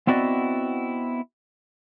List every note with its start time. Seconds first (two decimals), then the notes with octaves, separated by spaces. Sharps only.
0.07 B3 C4 E4 F#4 D5 D#5